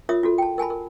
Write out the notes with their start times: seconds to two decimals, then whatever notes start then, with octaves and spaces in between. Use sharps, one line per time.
0.09 F4 A#4 C#5 E5 D#6
0.23 F4 F#4 A4
0.38 G5 A5
0.58 A#4 G#5 A5 B5
0.70 A#4